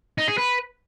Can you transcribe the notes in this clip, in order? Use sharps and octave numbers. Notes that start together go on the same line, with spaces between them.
D#4
G#4
B4